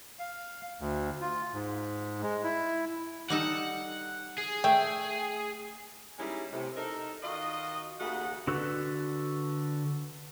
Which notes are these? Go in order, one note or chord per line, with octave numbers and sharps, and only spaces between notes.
F5
D2
F4
G#2
G#3
E4
G3 D#4 A4 F#5
G#4
A3 G5
G3 G#3 A#3 C#4 D#4 E4
A2 C3
D#4 A4 A#4
D#3 F4 F#4 D#5
D#2 C#3 A3 F#4 D#5 F#5
D3 F#4 A4 B4